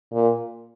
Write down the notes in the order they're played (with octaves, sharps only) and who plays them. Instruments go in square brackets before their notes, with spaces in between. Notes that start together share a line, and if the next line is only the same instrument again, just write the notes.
[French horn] A#2